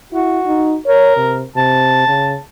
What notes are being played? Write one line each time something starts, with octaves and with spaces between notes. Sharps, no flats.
E4 F#4
D#4
A#4 C#5
C3
C3 A5
C#3